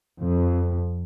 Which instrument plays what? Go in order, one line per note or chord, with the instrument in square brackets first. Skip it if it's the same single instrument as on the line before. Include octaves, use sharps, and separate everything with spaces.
[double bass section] F2